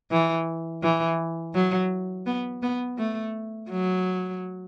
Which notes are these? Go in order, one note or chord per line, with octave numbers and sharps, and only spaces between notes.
E3
E3
F#3
B3
B3
A3
F#3